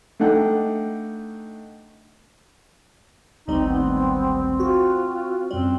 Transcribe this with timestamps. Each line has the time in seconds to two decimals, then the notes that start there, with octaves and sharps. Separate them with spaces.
0.20 A3 D4 D#4 F#5 G5
3.48 G#1 D2 G3 C4 D#4
3.68 B3
4.60 F4 F#4
5.51 F#2 G3 C4